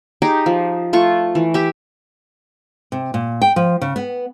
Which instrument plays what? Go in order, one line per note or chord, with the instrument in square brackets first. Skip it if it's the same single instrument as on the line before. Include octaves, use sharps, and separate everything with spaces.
[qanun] D#4 G4 G#4 D6
F3
A3 F4 C#6
E3
G4 E5
[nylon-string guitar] C3
A#2
G5
F3
C#3
B3